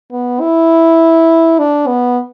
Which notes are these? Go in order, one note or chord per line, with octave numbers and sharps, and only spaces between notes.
B3
E4
D4
B3